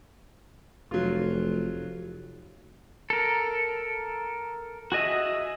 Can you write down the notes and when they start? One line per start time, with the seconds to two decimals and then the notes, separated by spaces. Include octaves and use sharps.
0.91 F1 F#3 F4
3.10 A4 A#4
4.92 F#4 G#4 D#5 E5